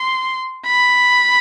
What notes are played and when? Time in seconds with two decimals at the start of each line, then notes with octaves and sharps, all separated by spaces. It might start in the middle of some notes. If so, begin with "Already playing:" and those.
Already playing: C6
0.67 B5